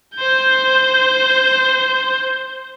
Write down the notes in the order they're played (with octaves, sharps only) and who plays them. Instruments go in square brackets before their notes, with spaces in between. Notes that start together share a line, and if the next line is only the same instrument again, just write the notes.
[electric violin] C5 G6